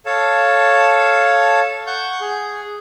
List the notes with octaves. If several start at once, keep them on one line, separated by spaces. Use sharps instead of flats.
A4 C#5 F5 A5
F#5 C#6 G6
G#4